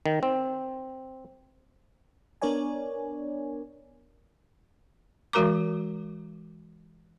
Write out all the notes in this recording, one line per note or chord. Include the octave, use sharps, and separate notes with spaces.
D#3
C4
B3 D4 A#4 C#5 D5 G#5
E3 G#3 F#4 A#4 A#5 D6